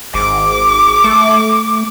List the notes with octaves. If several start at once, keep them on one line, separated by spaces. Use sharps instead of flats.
G#1 D6
A3